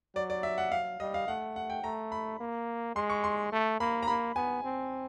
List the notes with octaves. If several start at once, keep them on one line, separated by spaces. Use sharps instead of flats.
F#3 D5
D5
E5
F#5
F#3 F5
G3 D#5
F5
A3 F#5
F#5
G5
A3 A#5
B5
A#3
G#3 C6
C#6
C6
A3
A#3 B5
A#5
A#3 B5
B3 G#5
C4